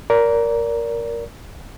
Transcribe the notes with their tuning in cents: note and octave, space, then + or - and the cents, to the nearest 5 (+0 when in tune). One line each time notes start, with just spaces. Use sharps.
A#4 +5 D5 -25